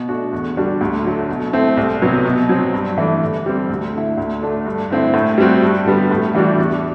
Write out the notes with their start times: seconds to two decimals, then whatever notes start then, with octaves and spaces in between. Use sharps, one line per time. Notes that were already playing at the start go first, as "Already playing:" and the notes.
Already playing: B2
0.09 A3 D4 F#4
0.33 E2
0.56 D3 G3 D4 F#4
0.81 D2
1.05 D3 F#3 A3
1.28 B2
1.53 A3 C4 E4
1.77 C2
2.01 C3 F#3 B3
2.25 B2
2.49 F#3 C4
2.73 G2
2.98 E3 A3 D4
3.21 D3
3.46 G3 C4
3.69 D2
3.93 D3 A3 E4
4.18 D2
4.42 D3 A3 D4
4.65 G2
4.90 D3 A3 C4 E4
5.14 A2
5.38 G3 C4 F#4
5.62 G2
5.86 D3 G3 B3
6.11 A2
6.34 E3 G3 D4 F#4
6.58 E2